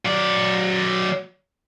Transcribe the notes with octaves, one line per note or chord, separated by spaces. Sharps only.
F#3 D5